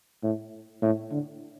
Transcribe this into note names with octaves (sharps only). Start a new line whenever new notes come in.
A2
A2
D3